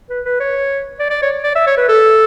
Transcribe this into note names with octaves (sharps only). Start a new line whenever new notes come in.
B4
B4
C#5
D5
D5
C#5
D5
E5
C#5
B4
A4